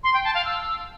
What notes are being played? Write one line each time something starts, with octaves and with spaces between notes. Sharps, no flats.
C6
G5
A5
F5
E6